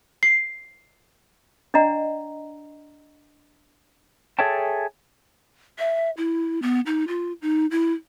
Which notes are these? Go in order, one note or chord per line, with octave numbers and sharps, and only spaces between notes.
C7
D4 D5 D#5 F#5 A#5
G#4 A4 C#5 E5 G5 A5
E5
E4
B3
D#4
F4
D#4
E4